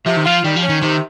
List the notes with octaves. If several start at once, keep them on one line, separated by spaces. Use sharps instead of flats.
C3 F3
D#3
F3 F4
D#3 G3
F3
C#4
D#3
C3 D#3